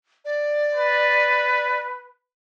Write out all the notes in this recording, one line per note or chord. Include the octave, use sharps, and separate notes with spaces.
D5
B4